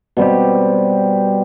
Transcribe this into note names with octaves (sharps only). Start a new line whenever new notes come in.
B2 G3 C4 G4